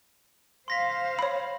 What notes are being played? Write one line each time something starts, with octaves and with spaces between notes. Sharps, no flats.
C5 F5 C6 A#6 B6
C#5 B5